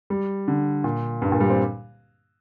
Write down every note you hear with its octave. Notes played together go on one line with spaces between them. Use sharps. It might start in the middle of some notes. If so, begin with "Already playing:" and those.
G3
D3
A#2
G2
A#2
G3
C4